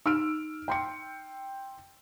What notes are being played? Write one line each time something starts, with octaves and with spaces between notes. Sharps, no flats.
D#4 E6 F6 D7
G5 C6 C#7